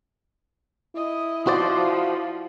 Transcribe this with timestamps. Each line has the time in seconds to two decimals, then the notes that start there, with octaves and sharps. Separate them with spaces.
0.96 E4 D#5
1.47 F3 F#4 C5 D5